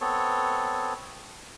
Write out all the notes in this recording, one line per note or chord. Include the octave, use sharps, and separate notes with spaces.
B3 C4 A4 C#5